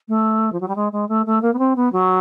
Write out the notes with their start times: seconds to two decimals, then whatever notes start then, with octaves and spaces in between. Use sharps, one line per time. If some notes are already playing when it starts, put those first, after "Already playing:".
0.08 A3
0.52 F3
0.61 F#3
0.68 G3
0.76 G#3
0.92 G#3
1.09 A3
1.26 A3
1.42 A#3
1.54 B3
1.59 C4
1.76 B3
1.93 F#3